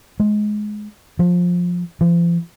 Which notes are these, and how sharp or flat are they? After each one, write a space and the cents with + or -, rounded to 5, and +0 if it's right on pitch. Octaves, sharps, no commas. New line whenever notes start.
G#3 +15
F3 +20
F3 -40